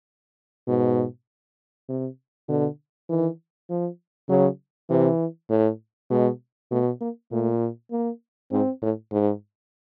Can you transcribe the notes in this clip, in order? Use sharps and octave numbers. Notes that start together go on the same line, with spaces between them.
G#2 B2
C3
B2 D3
D#3 E3
F3
C#3 F#3
C3 E3
A2
B2 G#3
B2 A3
A#3
A#2 A3
A#3
G#2 C4
A2
G#2